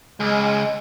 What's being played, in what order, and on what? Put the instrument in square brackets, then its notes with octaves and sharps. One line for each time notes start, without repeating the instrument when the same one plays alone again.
[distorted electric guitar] C#2 [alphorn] G#3